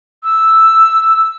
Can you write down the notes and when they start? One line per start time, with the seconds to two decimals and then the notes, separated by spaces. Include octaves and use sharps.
0.24 E6